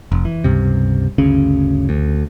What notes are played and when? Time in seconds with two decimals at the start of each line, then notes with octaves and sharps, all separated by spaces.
0.12 F1
0.25 E3
0.44 C#2 G2 C3
1.18 G1 D2 C#3 C#4
1.89 D2